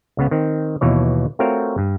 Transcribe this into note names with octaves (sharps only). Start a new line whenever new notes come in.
C#2 C#3 B3
D#3 C4
D#2 B2 E3 C#5
A3 C4 F4 F#4 A#4 C#5
G2